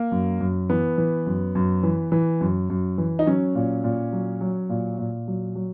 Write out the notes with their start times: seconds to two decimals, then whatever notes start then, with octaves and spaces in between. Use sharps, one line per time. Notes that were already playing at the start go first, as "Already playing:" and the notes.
Already playing: A#3
0.12 F#2
0.40 F#2
0.70 E3 B3
0.98 E3
1.27 F#2
1.55 F#2
1.83 E3
2.12 E3
2.41 F#2
2.70 F#2
2.98 E3
3.19 D#4
3.26 F#3 C#4
3.55 A#2
3.84 A#2
4.12 F#3
4.41 F#3
4.69 A#2
4.98 A#2
5.28 F#3
5.55 F#3